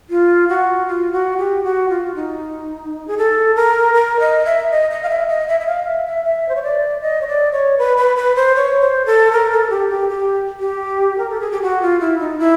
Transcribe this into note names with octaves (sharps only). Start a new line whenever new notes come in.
F4
F#4
F4
F#4
G4
F#4
F4
D#4
G#4
A4
A#4
A#4
D#5
E5
D#5
D#5
F5
E5
D#5
E5
E5
F5
E5
E5
E5
C5
C#5
D5
D#5
C#5
D5
C#5
B4
B4
B4
C5
C#5
C5
A4
A#4
A4
G4
G4
G4
G4
A#4
A4
G#4
G4
F#4
F4
E4
D#4
E4